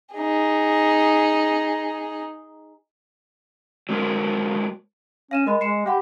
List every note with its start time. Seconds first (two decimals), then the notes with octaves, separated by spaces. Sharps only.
0.15 D#4 G#4
3.89 F#3 G#3 A#4 C5
5.31 C#4 F5 D#7 E7
5.47 G#3 A#4 D#5 B5
5.61 G#3 C7 C#7 E7
5.86 G4 F5 F#5 B5